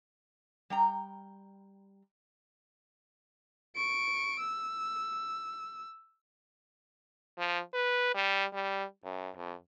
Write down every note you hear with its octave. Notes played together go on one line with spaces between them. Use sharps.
G3 G5 A#5
C#6 D7
E6
F3
B4
G3
G3
F#2
F2